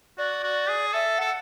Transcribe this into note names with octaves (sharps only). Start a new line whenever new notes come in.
F#4 D5
F#4
G#4
A4 E5
A4 F#5